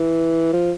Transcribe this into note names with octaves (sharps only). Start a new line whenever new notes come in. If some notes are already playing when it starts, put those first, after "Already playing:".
Already playing: E3
F3